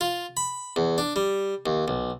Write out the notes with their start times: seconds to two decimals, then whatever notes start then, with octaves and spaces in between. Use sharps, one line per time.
0.01 F4
0.37 B5
0.76 E2
0.98 D4
1.16 G3
1.66 D#2
1.88 B1